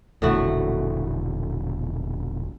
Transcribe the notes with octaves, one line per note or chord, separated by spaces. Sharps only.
E1 A#1 A2 D3 A3 F#4